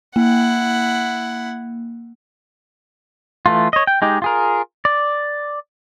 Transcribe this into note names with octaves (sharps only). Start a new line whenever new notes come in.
A#3 E4 F#5
E3 A3 F4
C#5 D#5
G5
G#3 D#4 G4
F4 G#4 A#4
D5